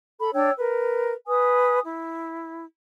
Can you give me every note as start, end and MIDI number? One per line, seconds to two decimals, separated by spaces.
0.20 0.31 69
0.20 0.31 83
0.34 0.51 62
0.34 0.51 73
0.34 0.51 79
0.34 0.51 88
0.58 1.14 70
0.58 1.14 71
1.28 1.80 71
1.28 1.80 80
1.28 1.80 87
1.85 2.64 64